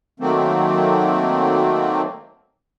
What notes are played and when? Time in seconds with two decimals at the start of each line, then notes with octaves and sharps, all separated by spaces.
0.20 D#3 F#3 A3 A#3 C4